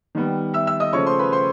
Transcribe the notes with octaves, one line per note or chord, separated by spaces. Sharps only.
D#3 G3 B3
E5 E6
E5 E6
D#5 D#6
C#3 F3 A3 C#5 C#6
C5 C6
B4 B5
C5 C6